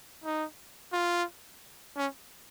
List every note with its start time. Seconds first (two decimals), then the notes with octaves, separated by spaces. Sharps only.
0.24 D#4
0.93 F4
1.96 C#4